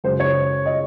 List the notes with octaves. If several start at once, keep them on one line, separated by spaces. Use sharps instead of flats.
F#2 C#3 G#3 C5
C#5
D#5